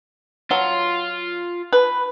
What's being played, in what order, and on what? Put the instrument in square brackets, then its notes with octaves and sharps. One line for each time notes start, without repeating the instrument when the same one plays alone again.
[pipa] F#3 [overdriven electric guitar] F4
[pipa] B4